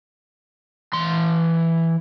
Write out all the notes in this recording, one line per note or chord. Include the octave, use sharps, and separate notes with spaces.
E3 C6